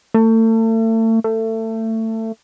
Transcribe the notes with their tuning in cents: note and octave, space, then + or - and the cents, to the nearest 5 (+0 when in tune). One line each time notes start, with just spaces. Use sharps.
A3 +35
A3 +25